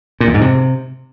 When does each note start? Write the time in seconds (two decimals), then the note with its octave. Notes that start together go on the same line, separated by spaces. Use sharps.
0.20 A#2
0.27 E2
0.34 G#2
0.41 C3